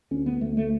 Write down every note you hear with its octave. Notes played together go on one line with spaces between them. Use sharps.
D2 C#4
B3
D2 A3
A3